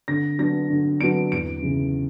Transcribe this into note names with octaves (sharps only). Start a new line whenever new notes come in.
D3 A#6
F#3 B3 D4 A#6
D3
F#3 B3 D4 D7
E2 D7
C#3 E3